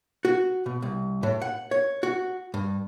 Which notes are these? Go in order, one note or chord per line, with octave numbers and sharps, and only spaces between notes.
F#4
B2
C2
A2
F#5
C#5
F#4
G2